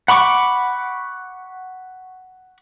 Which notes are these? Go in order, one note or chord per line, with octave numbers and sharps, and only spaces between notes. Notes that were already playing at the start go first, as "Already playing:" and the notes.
F#5 B5 C#6 D6